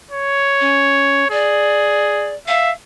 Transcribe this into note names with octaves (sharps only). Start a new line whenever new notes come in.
C#5
C#4
G#4 D5
E5 F5